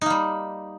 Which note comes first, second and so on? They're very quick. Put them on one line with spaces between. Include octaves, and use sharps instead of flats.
D#4 A#3 G3